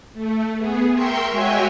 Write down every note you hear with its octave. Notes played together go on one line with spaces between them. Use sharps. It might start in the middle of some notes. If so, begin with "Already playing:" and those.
A3
B3 G#4
A#4 E5 G5 C6 C#6 G6
G#3 F#4 C#5 E5 G5 G#5